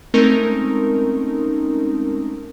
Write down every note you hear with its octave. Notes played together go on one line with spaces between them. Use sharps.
G#3 A3 C4 C#4 D#4 A#4